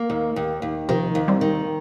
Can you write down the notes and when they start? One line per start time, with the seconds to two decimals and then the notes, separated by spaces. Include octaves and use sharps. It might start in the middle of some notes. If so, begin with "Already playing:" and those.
Already playing: A#3
0.10 D#2
0.36 D#2
0.62 D#2
0.89 C3 D#3 F3
1.15 D#2
1.28 G3 C4
1.41 D#3